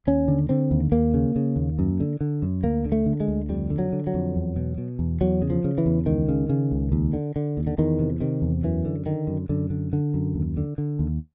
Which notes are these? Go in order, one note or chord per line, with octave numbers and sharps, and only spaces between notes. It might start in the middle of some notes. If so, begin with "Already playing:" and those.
D#2 C#4
D3
D3 C4
D#2
D#2 A#3
C#3
C#3
D#2
F#2
D3
D3
F#2
D2 A#3
D3
A3
D3
G#3
D2
F2 G3
D3
F#3
D3
F#3
F2
E2
B2
B2
E2
E2 F#3
C#3
F3
C#3
E3
E2
C#2 D#3
C#3
C#3
C#2
D#2
D3
D3
D#2
D3
E2 D#3
C3
C3 D#3
E2
F#2 E3
D3
D3 D#3
F#2
F#2 D3
D3
D3
F#2
D#2
D3
D3
D#2